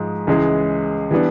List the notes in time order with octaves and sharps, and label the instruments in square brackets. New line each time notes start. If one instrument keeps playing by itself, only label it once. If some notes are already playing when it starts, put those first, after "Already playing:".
Already playing: [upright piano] G#2 F3 G#3
C#2 C#3 E3 G#3
E3 G3 B3 D4